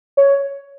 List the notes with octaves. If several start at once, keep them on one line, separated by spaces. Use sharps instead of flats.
C#5